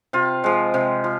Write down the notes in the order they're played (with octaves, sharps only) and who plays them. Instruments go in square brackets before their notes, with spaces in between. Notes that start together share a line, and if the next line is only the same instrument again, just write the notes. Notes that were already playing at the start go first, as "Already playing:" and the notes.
[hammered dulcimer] C3 F4
F3 G#3
C3
F3